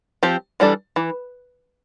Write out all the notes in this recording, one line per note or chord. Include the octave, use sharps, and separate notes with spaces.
F3 C4 G4
E3 G3 D4 A4
E3